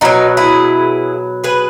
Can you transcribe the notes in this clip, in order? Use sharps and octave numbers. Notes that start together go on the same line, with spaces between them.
B2 F#3 D#4 F#4
E4 G#4
G#4 B4